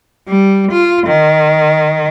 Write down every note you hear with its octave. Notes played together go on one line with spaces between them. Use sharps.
G3
F4
D#3